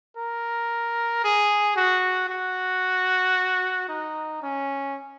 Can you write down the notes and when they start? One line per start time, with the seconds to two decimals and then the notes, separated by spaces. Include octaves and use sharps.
0.17 A#4
1.24 G#4
1.76 F#4
2.30 F#4
3.89 D#4
4.42 C#4